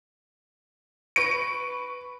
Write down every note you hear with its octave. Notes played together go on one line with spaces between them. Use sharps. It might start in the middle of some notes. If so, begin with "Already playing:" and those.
B4 C#6 D7